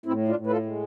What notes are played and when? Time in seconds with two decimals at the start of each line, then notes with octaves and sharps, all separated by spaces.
0.06 A2 C4 E4
0.28 D4 F4
0.36 A2
0.47 B4
0.51 F4 A4
0.66 G#3